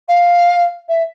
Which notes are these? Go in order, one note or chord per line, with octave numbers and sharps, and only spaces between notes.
F5
E5